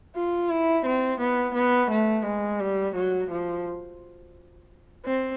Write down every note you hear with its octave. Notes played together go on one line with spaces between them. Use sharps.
F4
E4
C4
B3
B3
A3
G#3
G3
F#3
F3
C4